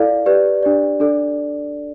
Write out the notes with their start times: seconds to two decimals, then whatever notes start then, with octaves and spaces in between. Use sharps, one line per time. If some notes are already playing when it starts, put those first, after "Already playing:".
Already playing: E4 A4 D5 F5
0.26 G4 B4 D5
0.63 D4 G4 D5
1.00 D4 A4 D5